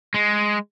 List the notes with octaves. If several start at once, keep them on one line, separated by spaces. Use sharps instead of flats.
G#3